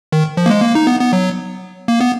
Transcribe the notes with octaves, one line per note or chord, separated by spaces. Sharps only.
D#3
F3
A#3
G#3
A#3
D#4
B3
B3
F#3
A#3
B3